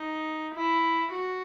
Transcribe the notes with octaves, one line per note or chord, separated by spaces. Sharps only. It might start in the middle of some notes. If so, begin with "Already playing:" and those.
Already playing: D#4
E4
F#4